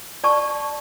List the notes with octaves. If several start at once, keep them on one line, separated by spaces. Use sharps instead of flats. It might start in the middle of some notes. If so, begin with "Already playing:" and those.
D5 A5 C#6